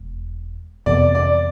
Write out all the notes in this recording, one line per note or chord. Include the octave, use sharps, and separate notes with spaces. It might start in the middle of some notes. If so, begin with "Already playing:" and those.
Already playing: E1
F2 C3 E3 B3 D5
D5